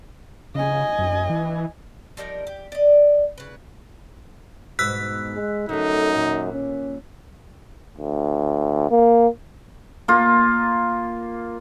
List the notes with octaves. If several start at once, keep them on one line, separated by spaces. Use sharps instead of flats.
C#3 D#5 G#5
F#2
E3
F3 G3 D#4 A#4
G4
D5 D#5
C#3 B4
G#2 B2 E6 F#6 B6
G#3
F#2 D3 A3 D#4
D#2 A#2
C#4
D2
A#3
A#3 F4